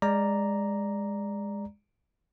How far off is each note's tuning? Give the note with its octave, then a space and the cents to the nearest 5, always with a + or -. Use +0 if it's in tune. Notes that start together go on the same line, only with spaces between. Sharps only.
G#3 -15 D5 +0 A#5 +0